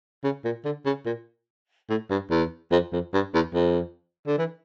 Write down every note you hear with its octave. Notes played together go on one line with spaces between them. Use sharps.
C#3
A#2
D3
C#3
A#2
A2
G2
E2
F2
F2
G2
E2
F2
D3
E3